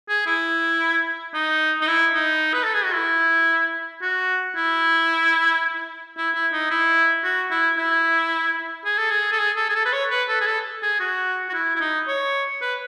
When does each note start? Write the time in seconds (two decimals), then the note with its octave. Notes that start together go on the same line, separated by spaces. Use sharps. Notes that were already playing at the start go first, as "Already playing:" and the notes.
0.09 G#4
0.26 E4
1.34 D#4
1.81 D#4
1.87 E4
2.14 D#4
2.53 B4
2.63 A4
2.74 G#4
2.84 F#4
2.94 E4
4.02 F#4
4.56 E4
6.17 E4
6.35 E4
6.53 D#4
6.71 E4
7.24 F#4
7.51 E4
7.78 E4
8.85 G#4
8.98 A4
9.11 G#4
9.32 A4
9.39 G#4
9.57 A4
9.69 G#4
9.75 A4
9.85 B4
9.92 C#5
10.10 B4
10.28 A4
10.41 G#4
10.46 A4
10.82 G#4
11.00 F#4
11.49 F#4
11.54 E4
11.76 E4
11.80 D#4
12.08 C#5
12.61 B4